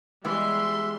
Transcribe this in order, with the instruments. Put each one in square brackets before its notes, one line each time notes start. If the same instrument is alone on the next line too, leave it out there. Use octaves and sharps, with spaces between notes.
[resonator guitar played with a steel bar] E3 B3 [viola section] G3 C6 [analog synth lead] G#3 [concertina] E5